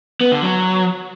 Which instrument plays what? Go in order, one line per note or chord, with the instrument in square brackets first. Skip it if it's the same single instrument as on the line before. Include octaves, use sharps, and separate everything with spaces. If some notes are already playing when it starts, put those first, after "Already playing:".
[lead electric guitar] B3
D3
F#3